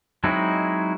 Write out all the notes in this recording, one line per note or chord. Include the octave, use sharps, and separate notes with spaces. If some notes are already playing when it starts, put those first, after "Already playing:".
F#3 G#3 C4 D#4 E4